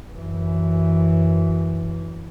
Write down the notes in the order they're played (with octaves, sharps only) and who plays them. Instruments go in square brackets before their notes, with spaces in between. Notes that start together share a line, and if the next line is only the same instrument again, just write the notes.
[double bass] F#2 E3